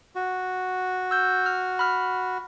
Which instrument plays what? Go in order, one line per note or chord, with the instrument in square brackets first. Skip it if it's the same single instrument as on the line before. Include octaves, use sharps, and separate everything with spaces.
[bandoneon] F#4
[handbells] E6 G6
F6
B5 F6